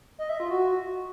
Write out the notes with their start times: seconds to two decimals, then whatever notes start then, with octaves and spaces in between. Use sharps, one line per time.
0.19 D#5
0.29 E5
0.40 F4
0.50 F#4